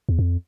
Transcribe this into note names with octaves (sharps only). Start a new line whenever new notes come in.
E2
F2